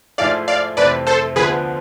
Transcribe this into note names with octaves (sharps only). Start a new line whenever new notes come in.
G#2 F3 A3 E4 G#4 D5 F5
D5 F5
F2 C3 E3 A3 C4 B4 D5
A4 C5
D2 D3 F3 B3 G#4 B4